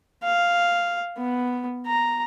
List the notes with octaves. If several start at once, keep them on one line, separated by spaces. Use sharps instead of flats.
F5
B3
A#5